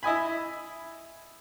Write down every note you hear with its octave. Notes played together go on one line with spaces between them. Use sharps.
E4 D#5 G#5 B5